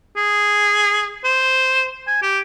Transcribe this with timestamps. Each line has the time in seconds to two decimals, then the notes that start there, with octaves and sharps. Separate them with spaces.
0.16 G#4
1.24 C5
2.07 G#5
2.22 G4